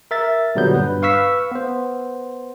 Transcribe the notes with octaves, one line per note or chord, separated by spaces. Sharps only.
A#4 E5 A6
A#2 D3 F#3 G3 B3 G6
G2 B4
B4 F5 C#6 E6 B6
B3 C5